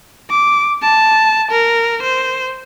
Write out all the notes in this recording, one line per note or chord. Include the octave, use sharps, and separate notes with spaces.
D6
A5
A#4
C5